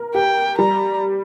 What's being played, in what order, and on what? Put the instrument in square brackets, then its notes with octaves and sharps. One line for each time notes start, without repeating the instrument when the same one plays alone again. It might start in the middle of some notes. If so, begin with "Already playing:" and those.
Already playing: [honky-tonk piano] A#4
[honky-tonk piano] G4 [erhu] G5
[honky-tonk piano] G3 [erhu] A#5